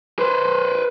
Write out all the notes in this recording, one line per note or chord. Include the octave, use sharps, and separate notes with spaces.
B4 C5